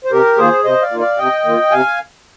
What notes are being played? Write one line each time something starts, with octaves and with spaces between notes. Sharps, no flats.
C5
C3 G4 A#4
D#3 A#3 F4 G#4 C5
C3 C5 D#5
D5 F5
D#3 A#3 F4
D5 F5
C3 D#5 G5
D#3 A#3 F4
C3 F5 G#5